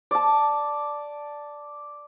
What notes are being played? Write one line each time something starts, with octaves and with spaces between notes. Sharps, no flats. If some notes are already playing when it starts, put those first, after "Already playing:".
D5 A5